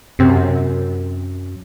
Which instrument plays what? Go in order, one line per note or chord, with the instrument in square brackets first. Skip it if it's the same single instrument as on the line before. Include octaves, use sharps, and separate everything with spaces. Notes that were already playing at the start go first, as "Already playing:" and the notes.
[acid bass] F#2 [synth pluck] C3 C4